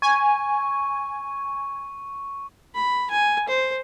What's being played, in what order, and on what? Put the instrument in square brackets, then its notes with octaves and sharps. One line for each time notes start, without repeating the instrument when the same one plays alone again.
[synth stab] G#5 [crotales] C#6
[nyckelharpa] B5
G#5
C5